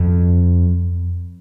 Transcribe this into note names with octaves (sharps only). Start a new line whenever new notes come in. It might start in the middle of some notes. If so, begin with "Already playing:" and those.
Already playing: F2